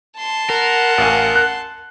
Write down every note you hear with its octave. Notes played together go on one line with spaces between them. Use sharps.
A5 C6
A#4 F#5
A1 F5 G#5
F#6